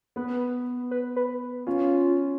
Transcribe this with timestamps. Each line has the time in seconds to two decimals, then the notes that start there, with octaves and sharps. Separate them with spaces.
0.16 B3 B4
0.91 B4
1.16 B4
1.67 C#4 F4